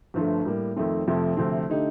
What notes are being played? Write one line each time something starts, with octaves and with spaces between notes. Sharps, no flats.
G1 G2 F3 A3
A2 G3 A#3
F2 D#3 A3 C4
F2 C3 F3 A3 C4
D2 C3 F3 A3 C4
D3 A3 D#4 G4